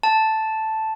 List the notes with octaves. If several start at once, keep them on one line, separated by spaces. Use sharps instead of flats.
A5